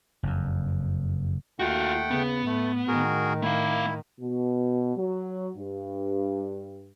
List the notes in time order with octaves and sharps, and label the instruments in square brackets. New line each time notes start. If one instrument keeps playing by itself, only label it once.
[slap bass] F#1 F2
[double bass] D#2 [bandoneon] A3 F#5 G5 [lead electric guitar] F4 F#4
[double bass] C#3 [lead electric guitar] B3
[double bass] A2 [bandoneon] A3
[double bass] A2 D#3 [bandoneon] F#4 G#4 A#4
[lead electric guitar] A3 F5 [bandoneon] E4
[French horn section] B2
F#3
G2